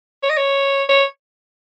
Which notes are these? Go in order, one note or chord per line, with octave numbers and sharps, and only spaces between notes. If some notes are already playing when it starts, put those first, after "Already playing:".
C#5
D#5
C#5
C#5